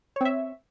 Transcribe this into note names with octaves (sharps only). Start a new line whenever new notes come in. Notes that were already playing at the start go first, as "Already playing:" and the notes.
C4 C#5 E5